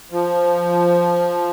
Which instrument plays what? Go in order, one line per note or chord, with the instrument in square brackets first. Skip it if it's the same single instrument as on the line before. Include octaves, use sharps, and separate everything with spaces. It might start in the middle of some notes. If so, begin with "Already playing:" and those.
[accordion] F3